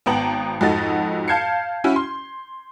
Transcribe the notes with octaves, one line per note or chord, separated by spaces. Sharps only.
G#1 B3 G5 A5 A#5 F#7
F2 G#2 F#4 A4 D#5 A6
F5 A5 G6 G#6 C7 C#7
C#4 E4 F#4
C6